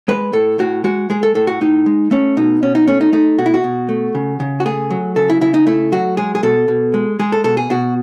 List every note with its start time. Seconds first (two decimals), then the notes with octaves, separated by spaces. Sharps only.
0.08 G#3 B4
0.33 A2 A4
0.59 A2 F#4
0.84 G#3 F#4
1.10 G#3 G#4
1.23 A4
1.35 A2 A4
1.47 F#4
1.61 A2 D#4
1.86 G#3
2.11 A3 C#4
2.37 B2 D#4
2.63 B2 C#4
2.75 D#4
2.87 A3 C#4
3.01 D#4
3.13 A3 D#4
3.38 B2 F#4
3.46 E4
3.54 F#4
3.64 B2
3.89 A3
4.15 C#3
4.40 C#3
4.60 F#4
4.66 A3 G#4
4.90 F#3
5.16 C#3 A4
5.30 E4
5.41 C#3 E4
5.54 D#4
5.67 A3 E4
5.92 F#3 F#4
6.17 G#3 G#4
6.35 G#4
6.43 B2 A4
6.68 B2
6.94 G#3
7.19 G#3 G#4
7.32 A4
7.44 B2 A4
7.57 G#4
7.70 B2 F#4